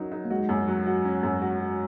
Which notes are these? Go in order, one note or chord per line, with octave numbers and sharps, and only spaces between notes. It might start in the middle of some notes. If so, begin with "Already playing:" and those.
Already playing: F#3 C#4 D#4 A#4
D#4
A#3
G#3 F#4
F#2
F#3
F#4
C#4
F#2
F#4
F#4